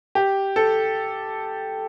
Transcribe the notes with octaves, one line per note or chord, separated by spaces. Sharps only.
G4
A4